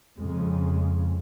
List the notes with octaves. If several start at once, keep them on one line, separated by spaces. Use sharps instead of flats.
F2 C#3 G#3